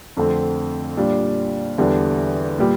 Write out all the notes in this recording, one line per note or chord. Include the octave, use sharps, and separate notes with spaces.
F2 D3 A3 C4
A#2 G3 D4 F4
E2 D3 G3 D4
A#2 G3